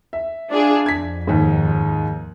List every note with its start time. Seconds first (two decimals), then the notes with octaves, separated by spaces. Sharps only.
0.13 E5
0.51 D4 F4 G#4
0.86 F2 G#6 B6
1.27 D#2 G#2